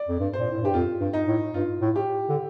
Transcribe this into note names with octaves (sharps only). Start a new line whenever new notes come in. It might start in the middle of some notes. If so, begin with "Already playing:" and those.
Already playing: D5
F2
G2
C5
A#2
A2
G2 G4
F2 F4
G2
D#4
A2
G2 F4
A2
G4
D3